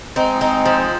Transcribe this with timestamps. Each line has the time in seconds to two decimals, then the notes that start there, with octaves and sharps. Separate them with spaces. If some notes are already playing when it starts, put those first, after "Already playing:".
0.16 G#3 C4 D#4
0.41 D#4
0.65 F3